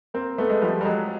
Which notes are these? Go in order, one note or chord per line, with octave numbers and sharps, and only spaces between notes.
A#3 C4
A3 B3
G#3
F3 G3
G3
F#3 G#3